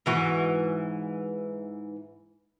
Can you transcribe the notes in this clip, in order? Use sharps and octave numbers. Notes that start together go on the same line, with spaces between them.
G#2 E3 F#4